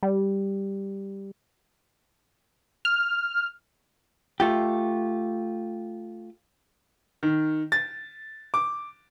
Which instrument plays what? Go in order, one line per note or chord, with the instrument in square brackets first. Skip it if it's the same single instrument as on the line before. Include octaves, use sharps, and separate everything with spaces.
[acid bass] G3
[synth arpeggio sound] F6
[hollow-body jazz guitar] A3 F4 G4
[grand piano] D#3
A6
D6